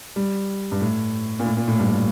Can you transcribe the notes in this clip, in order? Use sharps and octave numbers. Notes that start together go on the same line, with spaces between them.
G3
G2
A2
A#2
A2
A#2
A2
G2